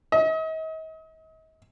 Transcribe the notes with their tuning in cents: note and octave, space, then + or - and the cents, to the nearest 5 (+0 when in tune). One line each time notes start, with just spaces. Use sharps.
D#5 +40